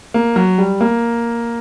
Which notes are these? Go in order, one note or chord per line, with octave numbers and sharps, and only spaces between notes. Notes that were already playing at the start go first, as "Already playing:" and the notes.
A#3
F#3
G3
A#3